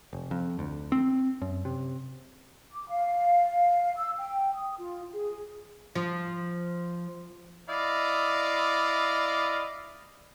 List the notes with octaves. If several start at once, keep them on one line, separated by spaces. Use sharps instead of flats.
F1
F2
D2
C4
F#2
C3
D6
F5
E6
G5
D#6
F4
G#4
F3
E4 D5 D#5 F5